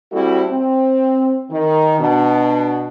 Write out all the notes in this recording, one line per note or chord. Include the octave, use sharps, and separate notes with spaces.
G3 A3 C4 E4 F#4 A4
C4
D#3
B2 D4